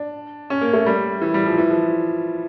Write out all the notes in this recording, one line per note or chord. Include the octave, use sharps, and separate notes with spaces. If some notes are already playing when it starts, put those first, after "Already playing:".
Already playing: D4
C#4
A#3
A3
G3
E3
G3
F3
E3
F3